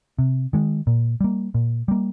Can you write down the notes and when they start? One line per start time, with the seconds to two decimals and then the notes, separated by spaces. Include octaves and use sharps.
0.18 C3
0.53 D#3 G#3
0.87 A#2
1.20 G3 A#3
1.54 A#2
1.88 G3 A#3